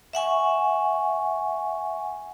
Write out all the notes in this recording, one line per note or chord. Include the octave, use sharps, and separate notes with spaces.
E5 F#5 G#5 C#6